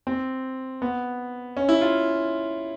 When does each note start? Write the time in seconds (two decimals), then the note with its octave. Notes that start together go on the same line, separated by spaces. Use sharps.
0.07 C4
0.82 B3
1.57 C#4
1.69 E4
1.81 F4